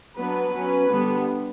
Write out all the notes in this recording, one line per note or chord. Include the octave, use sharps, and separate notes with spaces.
F#3 B3 D4 B4
F#3 C#4
D3 G3 B3